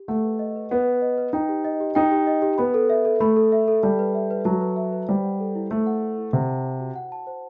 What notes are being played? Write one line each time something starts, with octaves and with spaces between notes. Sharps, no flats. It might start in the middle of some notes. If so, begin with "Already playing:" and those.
Already playing: G4
A3 F#5
B4
D#5
B4
B3 F#5
B4
D#5
B4
D#4 G5
G4
D#5
G4
D#4 G5
G4
D#5
G4
B3 B5
A4
E5
A4
A3 B5
A4
E5
A4
G3 A5
B4
E5
B4
F#3 A5
B4
E5
B4
G3 C5
F#5
A4
E4
A3 C5
F#5
A4
E4
C3 F#5
A5
C5
F#4
F#5
A5
C5